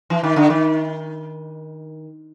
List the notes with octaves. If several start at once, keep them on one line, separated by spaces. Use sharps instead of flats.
E3
D#3
D3
D#3